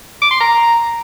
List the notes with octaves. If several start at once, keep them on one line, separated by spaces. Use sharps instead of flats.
D6
C6
A#5